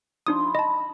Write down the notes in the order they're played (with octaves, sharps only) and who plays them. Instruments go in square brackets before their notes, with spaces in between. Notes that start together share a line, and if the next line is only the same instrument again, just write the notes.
[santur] F3 C6 [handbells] D4 D#4 D#6
[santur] E4
[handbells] D#5 A5 [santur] B5